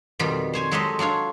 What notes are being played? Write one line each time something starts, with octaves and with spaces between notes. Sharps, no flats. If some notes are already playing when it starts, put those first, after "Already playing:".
F2 B2 D#3 G3
C5 C#5 G#5
F#3 G#3 C4 G4 A4 D#5
F#3 D4 F4 C#5